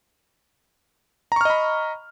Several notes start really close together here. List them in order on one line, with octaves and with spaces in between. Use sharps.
A#5 C#6 F6 D#5 B5